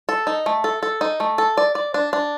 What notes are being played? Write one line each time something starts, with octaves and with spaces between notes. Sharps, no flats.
A4
D#4
A3
A4
A4
D#4
A3
A4
D5
D5
D4
D4